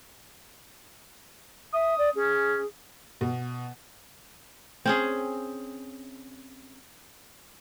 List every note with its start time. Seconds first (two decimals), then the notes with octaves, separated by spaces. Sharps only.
1.74 E5 D#6
1.98 D5
2.16 C#4 G#4
3.21 B2
4.86 C4 C#4 G#4